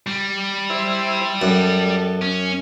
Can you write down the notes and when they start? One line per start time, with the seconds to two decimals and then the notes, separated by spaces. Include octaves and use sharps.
0.07 G3
0.70 E4 C5 E5
1.42 F#2 A4
2.22 C#4